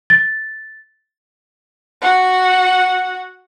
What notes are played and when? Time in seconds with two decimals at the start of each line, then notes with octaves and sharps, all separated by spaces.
0.10 A6
2.01 F#4 F#5